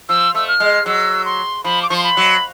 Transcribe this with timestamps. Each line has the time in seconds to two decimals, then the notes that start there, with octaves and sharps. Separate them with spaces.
0.09 F3 E6
0.35 A3 E6
0.48 F6
0.60 G#3
0.86 F#3 E6
1.25 C6
1.64 F3 B5
1.82 D6
1.90 F3 C#6
1.97 C6
2.04 B5
2.17 F#3